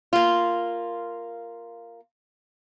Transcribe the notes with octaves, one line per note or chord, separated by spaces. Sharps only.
A#3 F4